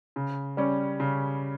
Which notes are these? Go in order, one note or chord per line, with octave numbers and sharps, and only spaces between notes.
C#3
G3 C#4
C#3